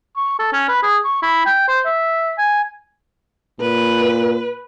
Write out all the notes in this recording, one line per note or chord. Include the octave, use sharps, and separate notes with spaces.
C#6
A4
C#4
B4
G#4
C#6
E4
G5
C5
E5
G#5
A#2 B4